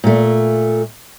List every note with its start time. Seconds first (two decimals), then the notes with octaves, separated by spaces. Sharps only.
0.04 A#2 A3